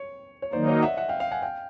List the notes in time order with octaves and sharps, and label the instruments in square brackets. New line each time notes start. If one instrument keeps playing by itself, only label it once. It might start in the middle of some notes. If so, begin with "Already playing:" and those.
Already playing: [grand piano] C#5
C#5
[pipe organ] D#3 F#3 A#3 D#4 [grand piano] C5 D5
[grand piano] C#5 D#5
E5 F#5
E5 F#5
F5 G5
F5 G5
F#5 G#5
F5 G5